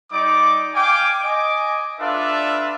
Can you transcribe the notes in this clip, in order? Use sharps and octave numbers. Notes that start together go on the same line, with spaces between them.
G3 D#4 D5 D6
F5 G5 G#5 D6
D#5 G#5 D6
D4 F4 A4 B4 D5 E5